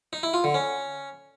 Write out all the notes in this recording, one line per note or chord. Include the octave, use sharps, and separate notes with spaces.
D#4
E4
F4
D3
C#4